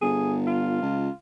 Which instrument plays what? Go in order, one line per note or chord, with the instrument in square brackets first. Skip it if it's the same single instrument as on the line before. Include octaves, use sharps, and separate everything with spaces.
[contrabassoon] G1 [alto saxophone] G#4
[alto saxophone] F4
[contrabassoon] C#2